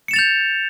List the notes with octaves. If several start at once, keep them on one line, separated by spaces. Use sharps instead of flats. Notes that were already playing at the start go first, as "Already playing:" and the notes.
G6 A6 C#7 E7 F7